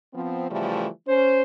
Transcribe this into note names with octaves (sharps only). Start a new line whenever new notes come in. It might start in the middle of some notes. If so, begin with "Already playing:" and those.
F3 B3 C4
C#3 E3 F3 G3 A3
C#4 C5